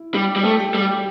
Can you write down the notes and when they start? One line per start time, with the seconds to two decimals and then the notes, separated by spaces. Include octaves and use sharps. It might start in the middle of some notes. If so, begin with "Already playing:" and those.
Already playing: E4
0.14 G3 G4 G5
0.36 G3 G4 G5
0.45 A3
0.59 G4 G5
0.74 G3
0.81 G4 G5